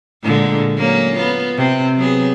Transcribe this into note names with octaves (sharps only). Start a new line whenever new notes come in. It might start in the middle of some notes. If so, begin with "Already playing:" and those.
A#2 D3 G#3
F#3 A#3 C#4
B3 F4
C3 C4
F#3 B3 G#4